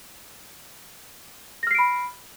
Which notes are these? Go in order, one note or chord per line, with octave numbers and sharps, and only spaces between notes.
B5 F6 A#6 C7 D7